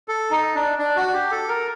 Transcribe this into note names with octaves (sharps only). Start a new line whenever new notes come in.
A4
D#4
D4
D4
F#4
G4
A4
A#4